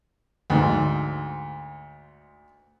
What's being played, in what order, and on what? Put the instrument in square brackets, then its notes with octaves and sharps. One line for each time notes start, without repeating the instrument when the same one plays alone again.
[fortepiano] D2 G#2